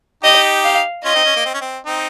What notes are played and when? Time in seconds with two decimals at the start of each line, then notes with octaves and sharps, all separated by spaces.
0.23 D#4 G4 D#5
0.65 F5
1.04 C#4 F4 D#5
1.15 C4 D#4
1.25 C#4
1.36 A#3
1.45 C4
1.54 C#4
1.61 C4
1.86 C4 D#4